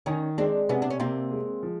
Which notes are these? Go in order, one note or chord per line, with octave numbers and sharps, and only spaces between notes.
D#3 C#4 D#4
G#3 C4 D4
C3 B3 C#4
D4
C#4
C3 A#3 C4
G#3
F3